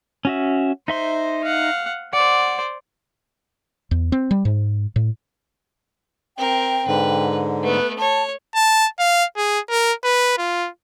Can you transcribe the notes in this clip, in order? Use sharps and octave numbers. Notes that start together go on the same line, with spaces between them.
C#4 F#4 E5
D#4 C5 E5 C6
F5 F#5
C5 D5 F#5
E2
C4
G3
G#2
A2
C4 A#4 G5
G#2 D3 B4
A3 B3 B4
C#5 A5
A5
F5
G#4
A#4
B4
F4